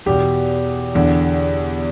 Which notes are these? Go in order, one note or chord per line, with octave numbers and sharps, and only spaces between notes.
E2 B2 G4
E2 D3